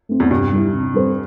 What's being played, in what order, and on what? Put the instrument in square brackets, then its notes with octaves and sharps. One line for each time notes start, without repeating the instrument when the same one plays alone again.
[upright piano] A3 C4
[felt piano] E2
[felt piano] G2 [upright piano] C3
[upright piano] G3 E4
C3
G3 C4 A4 C5